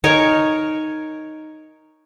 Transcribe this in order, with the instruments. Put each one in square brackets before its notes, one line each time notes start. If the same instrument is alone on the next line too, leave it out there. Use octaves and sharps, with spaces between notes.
[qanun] D#4 A#4 C#5 G#5